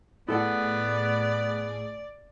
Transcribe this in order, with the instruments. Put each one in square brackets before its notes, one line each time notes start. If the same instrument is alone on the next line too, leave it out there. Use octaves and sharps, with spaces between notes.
[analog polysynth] A2 G#4 [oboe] B3 [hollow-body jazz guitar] E4 A4 F#5 [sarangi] D5